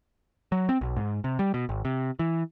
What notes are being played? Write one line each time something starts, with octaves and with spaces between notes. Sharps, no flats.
F#3
C4
B1
G#2
C3
G3
B2
G#1
C3
E3